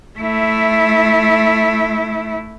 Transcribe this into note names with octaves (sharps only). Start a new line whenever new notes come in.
A3 E4